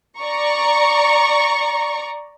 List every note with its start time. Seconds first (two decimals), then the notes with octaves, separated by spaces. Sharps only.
0.19 D5 A#5 C#6